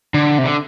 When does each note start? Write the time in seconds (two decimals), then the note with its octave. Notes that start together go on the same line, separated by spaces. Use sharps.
0.14 D3
0.38 C3
0.45 D3